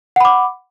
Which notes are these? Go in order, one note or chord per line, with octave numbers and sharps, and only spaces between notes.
F#5 B5 D6